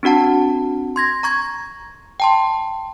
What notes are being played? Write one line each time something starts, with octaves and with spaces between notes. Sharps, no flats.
C4 D4 F#4 F#5 A5
C6 G#6 A#6
A#5 C#6 G#6
G5 A5 C6